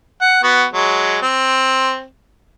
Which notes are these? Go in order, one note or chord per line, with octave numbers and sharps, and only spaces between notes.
F#5
B3 F#4
F#3 G#3
C4